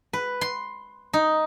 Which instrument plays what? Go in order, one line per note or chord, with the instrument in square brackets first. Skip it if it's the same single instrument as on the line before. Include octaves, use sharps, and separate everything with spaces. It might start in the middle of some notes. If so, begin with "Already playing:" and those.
[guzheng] B4
C6
D#4